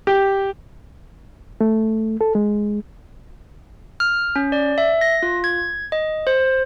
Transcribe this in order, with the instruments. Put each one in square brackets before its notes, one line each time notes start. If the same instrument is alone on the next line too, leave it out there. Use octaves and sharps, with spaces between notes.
[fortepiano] G4
[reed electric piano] A3
A4
G#3
[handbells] F6
C#4
D5
E5
A#6
F4
G#6
D#5
C5